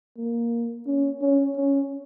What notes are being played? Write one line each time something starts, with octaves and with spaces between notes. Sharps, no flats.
A#3
C#4
C#4
C#4